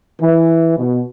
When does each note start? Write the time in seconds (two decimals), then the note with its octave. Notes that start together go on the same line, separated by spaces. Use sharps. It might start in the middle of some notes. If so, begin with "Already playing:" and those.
0.21 E3
0.78 B2